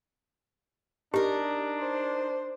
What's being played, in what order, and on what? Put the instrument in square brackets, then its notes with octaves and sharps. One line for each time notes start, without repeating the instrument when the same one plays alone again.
[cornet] D4 [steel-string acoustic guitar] D#4 A#4 [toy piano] G4
[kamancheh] C5